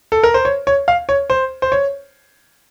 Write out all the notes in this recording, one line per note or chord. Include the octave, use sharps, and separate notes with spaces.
A4
A#4
C5
C#5
C#5
F5
C#5
C5
C5
C#5